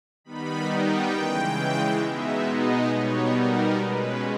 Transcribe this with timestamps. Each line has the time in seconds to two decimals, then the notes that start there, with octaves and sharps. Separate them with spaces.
0.24 D#3 G3 B3 D#4 B5
0.69 G5
1.12 C#3 E3 G#3
2.01 B2 G#3 B3 D#4 E5
2.46 D#5
2.90 B2 G3 B3 D#4 C#5
3.34 A#4
3.78 B2 G#3 C#4 B4